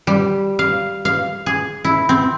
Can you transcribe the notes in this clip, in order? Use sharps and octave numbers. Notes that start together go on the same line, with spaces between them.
G3
F5
F5
G#4
E4
C4